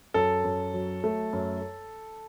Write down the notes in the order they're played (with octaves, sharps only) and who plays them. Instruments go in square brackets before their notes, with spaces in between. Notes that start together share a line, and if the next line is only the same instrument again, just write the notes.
[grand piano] F#2 A4
F#2
F#3
A3
F#2